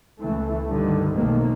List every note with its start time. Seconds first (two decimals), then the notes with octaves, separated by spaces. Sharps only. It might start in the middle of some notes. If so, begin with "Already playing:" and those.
0.21 C#2 E3 A3
0.68 G2 D3 D#3 G3
1.14 B1 F2 G#2 D#3 A3 A#3